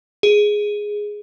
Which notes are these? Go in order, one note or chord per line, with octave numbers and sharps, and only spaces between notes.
G#4